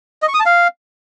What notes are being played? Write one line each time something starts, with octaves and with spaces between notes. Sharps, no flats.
D#5
C#6
D#6
A5
F5